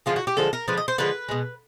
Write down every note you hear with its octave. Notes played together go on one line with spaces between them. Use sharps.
D3 F3 G#3 F4
F#4
G4
D3 F3 G#3 A4
A#4
D3 F3 G#3 B4
D#5
C5
D3 F3 G#3 B4
B2 G#3